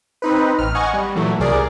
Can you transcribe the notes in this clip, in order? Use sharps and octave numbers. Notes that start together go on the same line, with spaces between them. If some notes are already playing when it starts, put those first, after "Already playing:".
C4 D#4 B4
A1 F6
D#5 F#5 G#5 C#6
G3
A#2 E3 F#3 A3
C2 C3 G#4 A#4 D5